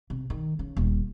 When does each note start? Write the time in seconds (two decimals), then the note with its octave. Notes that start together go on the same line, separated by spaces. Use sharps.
0.10 C3
0.30 D#3
0.59 C#3
0.77 D#1